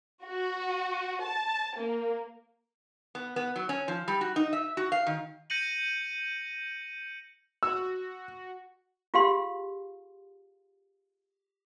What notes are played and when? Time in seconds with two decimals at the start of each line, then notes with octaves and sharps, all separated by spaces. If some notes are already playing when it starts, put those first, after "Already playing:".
0.25 F#4
1.24 A5
1.77 A#3
3.15 B3
3.36 B3
3.56 F#3
3.69 C#4
3.88 F3
4.08 G3
4.21 F#4
4.36 D#4
4.53 E5
4.77 F#4
4.92 F5
5.07 D#3
5.50 G6 A#6 C#7 D#7 F#7
7.63 F#4 E6
9.14 F4 G4 G#4 F5 C6